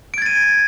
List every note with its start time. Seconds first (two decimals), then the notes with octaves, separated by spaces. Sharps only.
0.14 D7
0.18 G#6
0.22 A6
0.26 D#7